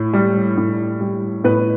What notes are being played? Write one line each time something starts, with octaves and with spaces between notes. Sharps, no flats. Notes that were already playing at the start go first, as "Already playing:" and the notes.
Already playing: A2
G3
A2
G3
A2 B3 B4